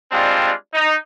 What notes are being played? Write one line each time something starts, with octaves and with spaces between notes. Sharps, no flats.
G3 G#3 C4 D4 F4
D#4